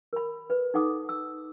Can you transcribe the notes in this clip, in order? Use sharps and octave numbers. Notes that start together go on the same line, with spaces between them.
A#4 B5
B4
D#4 A4 F#5 D6 D#6
E6